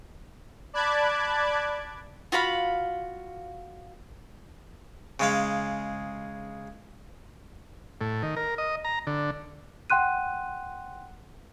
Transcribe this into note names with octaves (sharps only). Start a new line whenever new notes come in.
D5 A5 B5 D6 F#6 G#6
F4 F#4 F5 B5
C#3 G#3 F5
A2
D#3
A#4
D#5
A#5
D3
F#5 G5 C6 F#6 D#7